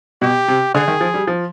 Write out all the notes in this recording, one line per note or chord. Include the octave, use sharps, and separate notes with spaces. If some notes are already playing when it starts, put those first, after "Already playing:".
B2 G4
C3
D3 G#4
D#3
F3
G3
F3